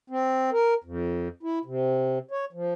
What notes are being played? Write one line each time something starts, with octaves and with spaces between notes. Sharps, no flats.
C4
A#4
F2
E4
C3
C#5
F3